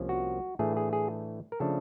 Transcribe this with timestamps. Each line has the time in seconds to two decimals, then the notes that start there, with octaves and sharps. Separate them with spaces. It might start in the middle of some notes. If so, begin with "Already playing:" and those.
Already playing: C2 C3 F3 A#3 C#4
0.09 F#4
0.59 A2 E3 A3 D4 G#4
0.77 G#4
0.93 G#4
1.52 A#4
1.60 C#3 F3 A3 D4 A4